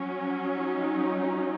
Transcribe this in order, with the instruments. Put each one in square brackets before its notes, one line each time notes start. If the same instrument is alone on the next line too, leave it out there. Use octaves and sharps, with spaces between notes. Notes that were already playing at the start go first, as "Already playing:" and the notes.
Already playing: [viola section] F#3 C#4
D#4